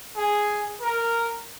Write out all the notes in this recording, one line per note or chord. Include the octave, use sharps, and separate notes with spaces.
G#4
A#4